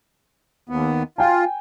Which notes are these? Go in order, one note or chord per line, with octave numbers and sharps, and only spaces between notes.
D#2 B3
F4 G5 G#5